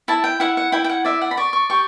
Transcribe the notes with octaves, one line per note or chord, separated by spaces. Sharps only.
E4 A5
G5
E4 F#5
F#5
E4 G5
G5
F#5
D5 E5
F#5
B5
D5 C#6
C#6
G4 C#6